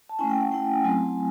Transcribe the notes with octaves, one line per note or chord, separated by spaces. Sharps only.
A5
A3 C#4 E4 G#5
G5
F#5
A3 C#4 E4 G5
F#3 A3 C4 E4 G#5